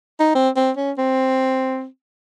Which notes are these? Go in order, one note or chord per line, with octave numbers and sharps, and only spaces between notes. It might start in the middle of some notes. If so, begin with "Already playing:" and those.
D#4
C4
C4
C#4
C4